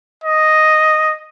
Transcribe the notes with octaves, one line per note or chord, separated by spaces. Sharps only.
D#5